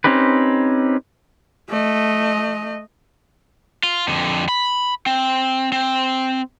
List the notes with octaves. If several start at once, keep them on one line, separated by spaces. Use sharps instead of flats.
C4 C#4 D#4 G4 B4
A3 D#5
F4
F2 D3
B5
C4
C4